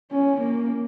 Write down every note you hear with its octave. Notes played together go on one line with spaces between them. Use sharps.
C#4
A#3